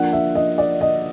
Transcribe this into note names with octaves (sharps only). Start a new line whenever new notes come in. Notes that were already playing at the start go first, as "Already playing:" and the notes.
Already playing: F3 A#3 D4 F#5
E5
D#5
D5
D#5